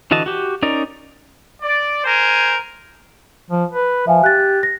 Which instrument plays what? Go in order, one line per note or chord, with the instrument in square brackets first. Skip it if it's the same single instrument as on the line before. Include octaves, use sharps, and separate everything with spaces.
[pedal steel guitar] D3 E3 F#4 D#5 A5
F#4 G4
C#4 D#4 A#4 D5
[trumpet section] D5
A#4 C5 G#5
[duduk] F3
B4
[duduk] F3 [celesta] E5 F5 G#5
[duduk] G4 [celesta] F#6 A6
[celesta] A#6